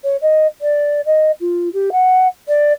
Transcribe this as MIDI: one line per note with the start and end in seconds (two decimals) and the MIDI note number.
0.04 0.17 73
0.22 0.47 75
0.61 1.01 74
1.06 1.32 75
1.41 1.69 65
1.74 1.90 67
1.92 2.28 78
2.48 2.73 74